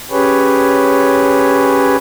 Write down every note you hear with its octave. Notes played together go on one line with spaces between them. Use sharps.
C#4 G4 G#4 B4 C#5